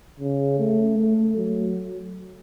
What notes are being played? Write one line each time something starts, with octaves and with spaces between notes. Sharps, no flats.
C#3
A3
A3
F#3